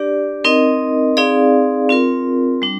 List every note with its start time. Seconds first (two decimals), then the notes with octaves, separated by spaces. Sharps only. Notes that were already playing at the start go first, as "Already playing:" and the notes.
Already playing: D4 G4 D5
0.44 C4 D#4 A#4 D#5
1.17 C4 D#4 G#4 D5 F5
1.89 C4 F4 A#4
2.62 G3 D4